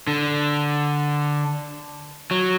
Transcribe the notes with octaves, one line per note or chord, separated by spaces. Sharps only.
D3
F#3